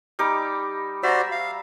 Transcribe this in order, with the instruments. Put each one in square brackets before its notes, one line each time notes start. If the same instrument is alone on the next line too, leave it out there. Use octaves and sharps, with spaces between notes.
[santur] G3 D#4 D6
[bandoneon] F#4 C5 D5 [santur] E5 A#5
[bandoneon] F5